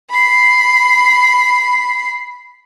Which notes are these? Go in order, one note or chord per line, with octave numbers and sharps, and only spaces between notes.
B5 C7